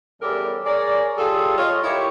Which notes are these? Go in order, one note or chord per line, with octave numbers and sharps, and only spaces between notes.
E2 G3 C#4 G4 A4 A#4
G#4 A#4 C#5 D5
G3 F4 G#4 A4
F4 C#5 D#5
E4 G4 A#4 C#5